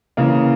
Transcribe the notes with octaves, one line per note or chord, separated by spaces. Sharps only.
C#3 E3 A#3